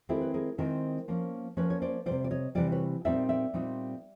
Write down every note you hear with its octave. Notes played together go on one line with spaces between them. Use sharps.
D#3 G#3 C4 E4 G4 A4
B4
G#4 A#4
D#3 G#3 C4 E4 A#4 C5
F3 A#3 C#4
F3 A#3 C#4 B4 C#5
C#5
C5 D5
E3 G3 C5 D5
C3
D5
C#5 D#5
C3 E3 G3 C5 D5
B4 C#5
A#2 G3 C4 D#4 D5 E5
D5 E5
A#2 G3 C4 D#4